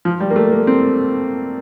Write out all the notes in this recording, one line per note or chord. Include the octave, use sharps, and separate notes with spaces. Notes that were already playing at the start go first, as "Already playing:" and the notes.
F3
G3
A#3
A3
A#3
C4